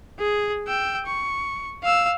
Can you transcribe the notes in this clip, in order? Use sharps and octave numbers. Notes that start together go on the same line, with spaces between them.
G#4
G5 E6
C#6
F5 E6